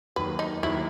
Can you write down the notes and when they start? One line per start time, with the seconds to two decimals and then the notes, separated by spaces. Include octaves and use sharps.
0.16 D#2 D#3 F#3 B4
0.39 D#4
0.62 D#2 D#3 F#3 E4